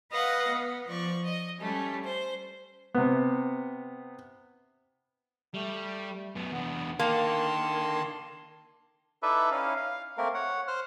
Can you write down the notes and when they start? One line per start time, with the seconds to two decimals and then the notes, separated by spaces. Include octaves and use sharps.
0.11 B4 D#5 F5 F#5
0.48 B3
0.89 F3 D5 C#6
1.23 D#5
1.60 G3 A3 C#4
2.04 C5
2.94 C3 B3
5.54 G3 A3
6.35 F#2 B3
6.52 E2 B3 D4
6.99 D3 D#3 A#3 A5 C6
9.23 D#4 E4 A4 B4 D5 E5
9.51 C#4 D#4 E4 F5
9.76 F5
10.18 A3 A#3 C4 A#4
10.34 C#5 F#5
10.68 C5 F6 F#6